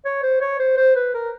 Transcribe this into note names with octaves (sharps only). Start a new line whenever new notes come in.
C#5
C5
C#5
C5
C5
B4
A#4